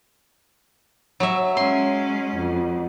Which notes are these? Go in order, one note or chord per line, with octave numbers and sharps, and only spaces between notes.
F#3 E5
G#3 C#4 C6
F2